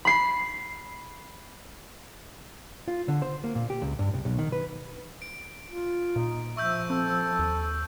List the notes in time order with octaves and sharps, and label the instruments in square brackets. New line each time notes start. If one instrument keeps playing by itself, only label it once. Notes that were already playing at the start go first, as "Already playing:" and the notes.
[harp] B5 C7
[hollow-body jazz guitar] F4
D3
C5
A#3
A#2
G4
C#2
G2
C2
B1
D#3
B4
[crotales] D7
[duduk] F4
[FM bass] A#2 [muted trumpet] D#4
[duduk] F3 [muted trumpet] E5 [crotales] C#6 E6 G6
[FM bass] C4 [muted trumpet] A4
[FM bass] D#2